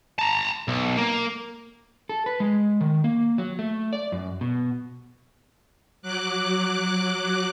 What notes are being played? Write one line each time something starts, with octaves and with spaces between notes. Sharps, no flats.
A5 A#5
B1
A#3
A4
B4
G#3
D#3
A#3
F#3
A3
D5
F#2
B2
F#3 D6 F#6